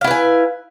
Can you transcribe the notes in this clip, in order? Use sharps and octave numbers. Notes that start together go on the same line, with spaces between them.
E4 B4 F5 G#5